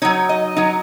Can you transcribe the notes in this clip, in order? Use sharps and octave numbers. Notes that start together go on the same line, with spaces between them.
F#3 D#4 C#5
D#5
F#3 D#4